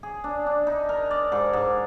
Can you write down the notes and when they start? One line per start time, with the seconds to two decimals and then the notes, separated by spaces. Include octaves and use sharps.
0.03 G#4
0.24 D4
0.46 D4
0.67 D#4
0.89 A#4
1.11 D5
1.32 G#2
1.53 G#2